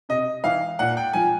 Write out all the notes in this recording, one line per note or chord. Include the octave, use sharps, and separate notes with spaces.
C3 D#5
E3 F5
A#2 F#5
G5
F3 G#5